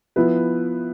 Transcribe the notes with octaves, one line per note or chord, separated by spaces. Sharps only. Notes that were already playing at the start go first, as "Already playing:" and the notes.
F3 B3 E4 B4